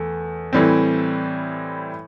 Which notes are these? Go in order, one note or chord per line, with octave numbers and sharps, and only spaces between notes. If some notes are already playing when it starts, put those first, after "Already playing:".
Already playing: E2 A3
A2 E3 G3 C4